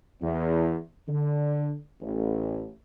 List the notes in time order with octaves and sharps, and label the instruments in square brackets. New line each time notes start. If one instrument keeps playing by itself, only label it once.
[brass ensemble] E2
D3
A1